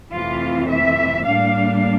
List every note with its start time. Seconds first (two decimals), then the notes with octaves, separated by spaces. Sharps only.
0.13 F2 C3 E3 A3 F4
0.69 E5
1.25 A2 G3 A#3 D4 F5